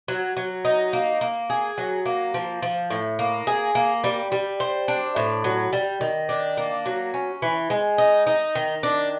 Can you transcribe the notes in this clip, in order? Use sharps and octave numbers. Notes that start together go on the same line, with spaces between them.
F#3
F#3
D#4
A#3
A#3
G#4
F#3
A#3
F3
F3
A2
A#3
G#4
A#3
G3
G3
C5
D4
A2
F#3
G3
D#3
D4
A#3
F#3
C#4
E3
G#3
D#4
D#4
D#3
D4